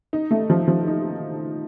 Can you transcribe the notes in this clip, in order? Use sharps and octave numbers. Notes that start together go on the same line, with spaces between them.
D#4
A3
F3
F3
D#4